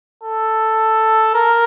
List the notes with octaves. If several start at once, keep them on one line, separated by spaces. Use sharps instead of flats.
A4
A#4